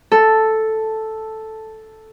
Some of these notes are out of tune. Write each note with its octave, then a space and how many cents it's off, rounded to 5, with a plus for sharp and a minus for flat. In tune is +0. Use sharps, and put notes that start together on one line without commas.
A4 +0